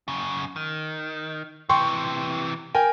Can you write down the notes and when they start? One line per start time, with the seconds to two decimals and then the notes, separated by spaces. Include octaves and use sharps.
0.08 F#2 C#3
0.56 D#3
1.69 C3 E3 G5 C6 C#6
2.75 A#4 G5 G#5